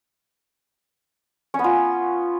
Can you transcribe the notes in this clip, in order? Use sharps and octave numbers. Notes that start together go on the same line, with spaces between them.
C#4
B3
F4